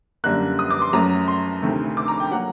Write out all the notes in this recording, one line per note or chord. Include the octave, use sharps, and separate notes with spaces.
F#2 D3 G3 A#3 F#6
D#6
D6
C6
F#2 F#3 A3 A#5
C6
D2 C3 D#3 A3
D6
A#5
G5
F#3 A#3 F#5